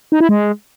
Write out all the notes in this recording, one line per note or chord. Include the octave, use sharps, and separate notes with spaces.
D#4
E4
G#3